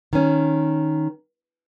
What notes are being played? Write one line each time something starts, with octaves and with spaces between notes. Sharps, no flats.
D#3 C#4